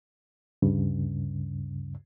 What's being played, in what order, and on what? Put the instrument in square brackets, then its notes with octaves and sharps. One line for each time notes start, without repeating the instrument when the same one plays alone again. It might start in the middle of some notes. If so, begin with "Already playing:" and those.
[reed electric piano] D2 G2 C#3